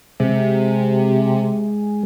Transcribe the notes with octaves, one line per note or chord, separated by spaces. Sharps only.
C3 G#3